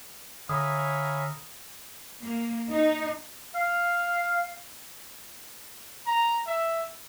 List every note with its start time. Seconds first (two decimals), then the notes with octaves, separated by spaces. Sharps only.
0.49 D3 C#5 E5 F5 G#5 A#5 B5 D#6
2.22 A#3
2.71 D#4
3.55 F5
6.06 A#5
6.47 E5